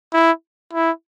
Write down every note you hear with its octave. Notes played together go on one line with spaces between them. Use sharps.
E4
E4